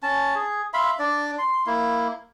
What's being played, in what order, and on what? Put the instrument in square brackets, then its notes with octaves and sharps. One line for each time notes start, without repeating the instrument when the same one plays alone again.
[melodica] C#4 A5
G#4
E5 F5 B5 C6
D4 D5
C6
A#3 E4